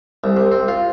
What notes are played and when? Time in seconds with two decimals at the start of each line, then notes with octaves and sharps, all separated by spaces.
0.24 C2
0.37 C3
0.52 C4
0.68 F4